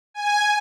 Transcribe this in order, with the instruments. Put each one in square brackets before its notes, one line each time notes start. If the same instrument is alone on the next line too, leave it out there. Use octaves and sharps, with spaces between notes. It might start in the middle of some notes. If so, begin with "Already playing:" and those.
[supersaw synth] G#5